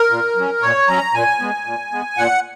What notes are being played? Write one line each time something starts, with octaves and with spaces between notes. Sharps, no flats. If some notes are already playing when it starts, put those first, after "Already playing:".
Already playing: A#4
A#2
F#3 C#4
A#2 C#5
F#3 C#4 A#5
A#2 G#5
G#3 B3
A#2
G#3 B3
A#2 F#5